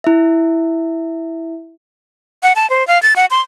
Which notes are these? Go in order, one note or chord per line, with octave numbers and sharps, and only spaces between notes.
E4 E5
F#5
A5
C5
F5
A6
F#5
C6